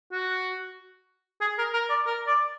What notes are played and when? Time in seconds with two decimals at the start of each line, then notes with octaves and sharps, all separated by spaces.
0.12 F#4
1.41 G#4
1.58 A#4
1.73 A#4
1.90 D5
2.06 A#4
2.27 D5